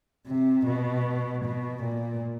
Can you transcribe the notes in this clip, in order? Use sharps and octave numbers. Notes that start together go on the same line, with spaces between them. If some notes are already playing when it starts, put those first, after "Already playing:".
C3
B2
B2
A#2